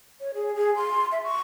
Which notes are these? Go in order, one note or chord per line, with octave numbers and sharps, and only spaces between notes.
C#5
G#4
G#4
C6
E5
C#6